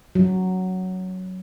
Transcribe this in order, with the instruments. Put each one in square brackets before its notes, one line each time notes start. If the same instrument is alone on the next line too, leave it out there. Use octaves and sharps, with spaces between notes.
[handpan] F#3